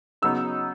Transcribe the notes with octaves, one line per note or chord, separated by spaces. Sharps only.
C#3 F#3 B3 D#4 E6